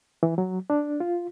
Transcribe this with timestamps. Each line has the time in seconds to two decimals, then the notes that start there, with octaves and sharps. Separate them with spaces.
0.23 E3
0.38 F#3
0.70 D4
1.00 F4